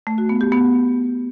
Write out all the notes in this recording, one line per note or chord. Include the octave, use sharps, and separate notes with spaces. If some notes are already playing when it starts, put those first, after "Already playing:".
A3
F#4
B3
G4
B3